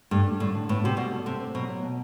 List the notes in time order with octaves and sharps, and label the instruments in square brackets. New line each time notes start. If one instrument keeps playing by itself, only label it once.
[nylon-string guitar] G2 [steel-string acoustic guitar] A3
[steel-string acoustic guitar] D4
[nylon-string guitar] A2 [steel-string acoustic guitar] D3
[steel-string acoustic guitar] D3
[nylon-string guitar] A2 [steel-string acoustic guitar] B3
[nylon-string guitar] C3 [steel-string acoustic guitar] F#4
[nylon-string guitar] B2 [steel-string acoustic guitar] G3
[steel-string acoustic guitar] A4
[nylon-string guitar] C3 [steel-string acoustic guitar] A3
[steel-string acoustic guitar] C4
[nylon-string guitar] B2 [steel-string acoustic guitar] F#3
[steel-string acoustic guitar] F#3
B2